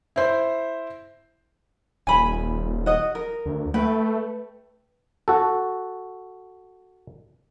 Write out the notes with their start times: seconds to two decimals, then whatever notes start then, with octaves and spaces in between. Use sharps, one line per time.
0.16 E4 C5
2.07 D#1 G#5 B5
2.86 F#4 D#5
3.15 A#4
3.46 D2
3.74 A3 B4 G5
5.28 F#4 A4